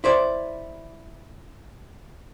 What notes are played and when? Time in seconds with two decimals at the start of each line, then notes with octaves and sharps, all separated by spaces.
0.04 E4 C5 D5